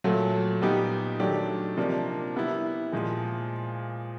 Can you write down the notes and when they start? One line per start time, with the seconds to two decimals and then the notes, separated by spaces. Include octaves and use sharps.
0.04 A#2 F#3 A3
0.61 A#2 G3 B3 D#4 G4
1.20 D#3 F#3 A3 D4 G4
1.77 C3 F3 A#3 D4
2.36 G3 B3 E4
2.92 A#2 F3 G#3